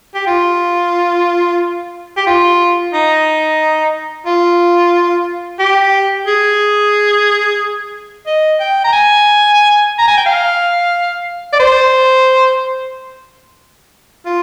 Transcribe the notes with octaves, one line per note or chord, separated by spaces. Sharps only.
G4
F4
G4
F4
D#4
F4
G4
G#4
D#5
G5
A#5
G#5
A#5
G#5
G5
F5
D5
C5
F4